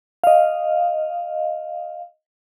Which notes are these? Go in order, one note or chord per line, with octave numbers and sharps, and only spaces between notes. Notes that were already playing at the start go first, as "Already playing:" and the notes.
D#5 F5